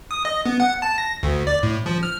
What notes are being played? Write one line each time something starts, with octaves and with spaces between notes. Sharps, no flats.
D#6
D#5
B3
F#5
A5
A#6
D2
D5
A2
F3
F6